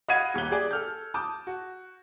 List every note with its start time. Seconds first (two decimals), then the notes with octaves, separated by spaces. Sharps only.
0.08 D#5 F5 F#5 B5 G#6 D#7
0.34 D#1 D#2 G4 F#6 G7
0.51 G4 G#4 D5 G#5
0.71 A4 F6 G6
1.14 A5 D6 D#6 G6
1.47 F#4